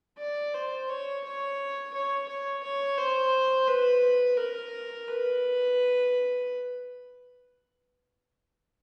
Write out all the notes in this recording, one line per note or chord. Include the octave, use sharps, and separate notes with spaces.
D5
C5
C#5
C#5
C#5
C#5
C#5
C5
B4
A#4
B4